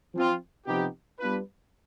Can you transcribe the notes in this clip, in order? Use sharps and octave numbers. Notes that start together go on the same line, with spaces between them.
F3 C4 F4
C3 F3 B3 D#4 G4
G3 B3 D4 F4 B4